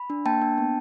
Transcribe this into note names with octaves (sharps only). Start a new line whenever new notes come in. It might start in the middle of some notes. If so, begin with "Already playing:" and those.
Already playing: B5
D4
A#3 G5 A5
D4
B3